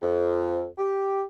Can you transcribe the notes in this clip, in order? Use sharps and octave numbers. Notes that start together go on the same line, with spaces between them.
F2
G4